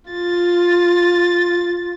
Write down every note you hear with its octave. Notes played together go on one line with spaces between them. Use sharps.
F4 A6